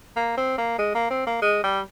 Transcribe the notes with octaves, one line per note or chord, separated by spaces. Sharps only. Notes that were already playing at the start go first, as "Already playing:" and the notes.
A#3
C4
A#3
G#3
A#3
C4
A#3
G#3
G3